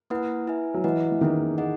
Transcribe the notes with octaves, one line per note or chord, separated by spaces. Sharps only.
A#3 E4 B4 F#5
E4 B4 E5 G#5
F#3
E3 E4 B4 D#5 F#5
E3
D#3 A#3 C#4 E4 G#4 B4
G#4 D#5 F#5